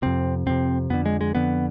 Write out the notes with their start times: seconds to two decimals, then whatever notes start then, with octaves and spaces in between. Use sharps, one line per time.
0.02 F2 C3 C4
0.46 F2 C3 C4
0.90 F2 D3 B3
1.06 G#3
1.21 G#3
1.35 F2 D3 B3